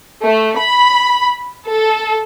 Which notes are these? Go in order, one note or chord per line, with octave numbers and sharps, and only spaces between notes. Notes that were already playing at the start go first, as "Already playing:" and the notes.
A3
B5
A4